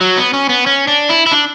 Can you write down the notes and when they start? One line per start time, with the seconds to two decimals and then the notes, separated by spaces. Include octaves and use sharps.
0.01 F#3
0.17 B3
0.33 C#4
0.49 B3
0.66 C#4
0.87 D4
1.09 E4
1.26 E4
1.32 D4